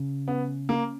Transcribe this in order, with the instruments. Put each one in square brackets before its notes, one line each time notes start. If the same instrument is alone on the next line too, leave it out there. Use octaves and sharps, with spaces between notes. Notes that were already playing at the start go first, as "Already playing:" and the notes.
Already playing: [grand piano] C#3
[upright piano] B3 [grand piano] C#4
[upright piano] A#3 [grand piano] C#4